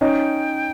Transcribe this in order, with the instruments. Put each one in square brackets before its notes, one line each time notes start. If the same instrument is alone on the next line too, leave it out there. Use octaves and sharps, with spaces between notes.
[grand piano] C#4 D#4 [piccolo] G5